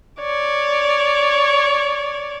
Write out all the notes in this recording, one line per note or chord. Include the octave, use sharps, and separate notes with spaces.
C#5 D5